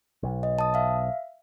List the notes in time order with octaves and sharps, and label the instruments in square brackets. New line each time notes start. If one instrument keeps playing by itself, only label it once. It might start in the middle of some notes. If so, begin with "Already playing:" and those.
[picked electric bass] B1
[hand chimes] D#5
A5 D#6
E5 F5